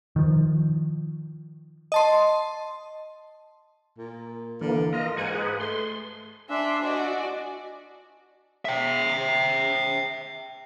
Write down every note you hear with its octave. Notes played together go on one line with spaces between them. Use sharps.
D#3 F3
D#5 A5 C6
A#2
D3 E3 A#3
F4 A#4 D#5
G#2 F#5 G#5
G#4 B4
A3 C6
D4 D5 E5 G#5 C6
F#4 D5 D#5
E5 G5